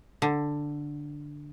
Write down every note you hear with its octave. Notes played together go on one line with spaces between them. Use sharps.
D3